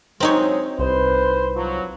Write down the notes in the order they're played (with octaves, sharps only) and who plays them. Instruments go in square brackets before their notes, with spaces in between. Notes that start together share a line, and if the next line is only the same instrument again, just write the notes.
[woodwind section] F#3 G#3 [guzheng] C4 D#4 C#5
[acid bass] C2 [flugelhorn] B4 [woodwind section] C5
[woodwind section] F3 F#3